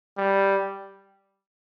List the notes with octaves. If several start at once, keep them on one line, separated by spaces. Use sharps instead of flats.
G3